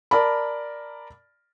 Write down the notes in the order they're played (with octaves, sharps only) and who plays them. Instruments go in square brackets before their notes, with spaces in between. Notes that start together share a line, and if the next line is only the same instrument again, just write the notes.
[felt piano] A#4 D5 A5 B5